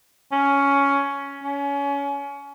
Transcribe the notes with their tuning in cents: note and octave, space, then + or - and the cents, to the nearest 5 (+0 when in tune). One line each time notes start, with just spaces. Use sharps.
C#4 +10
C#4 +25